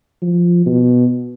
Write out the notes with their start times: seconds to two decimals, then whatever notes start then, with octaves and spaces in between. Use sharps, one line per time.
0.22 F3
0.66 B2